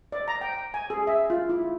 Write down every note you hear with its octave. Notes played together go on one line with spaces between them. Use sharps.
D5
A#5
G5
G#5
G#4
E5
F4
E4